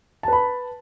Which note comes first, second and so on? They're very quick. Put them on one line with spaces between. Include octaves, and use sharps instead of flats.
A5 B4 B5